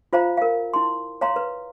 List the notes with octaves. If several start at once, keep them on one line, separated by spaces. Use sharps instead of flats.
F4 C5 F5 A#5
A#4 F5
E4 C6
C#5 F5 A#5 C6
B4